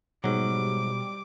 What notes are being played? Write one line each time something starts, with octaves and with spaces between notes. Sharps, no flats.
G#2 B2 F#3 G3 D6